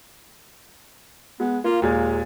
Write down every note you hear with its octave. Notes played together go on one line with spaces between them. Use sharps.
G#3 B3
A#3 F4
D#2 A#2 G#3